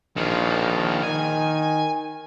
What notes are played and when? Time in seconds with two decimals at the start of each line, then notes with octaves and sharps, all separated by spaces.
0.17 A#1 D#3 F4
1.03 D#3 G#5